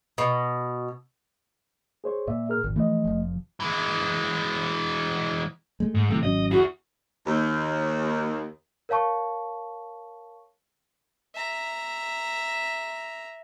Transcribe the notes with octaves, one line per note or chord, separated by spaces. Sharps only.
B2
G#4 C5 C#5
A#2 D5 E5
G#4 A#4 F6
G#1 E2
E3 F3 A3 D#5
F1 F3
E3 G#3
G#3 A3
G#2
C3 E3 G3 A3
G#1 F#3 C#4 D#5
E4 F#4 G#4
D#2
A#4 C#5 F5 A5 C#6
E5 A#5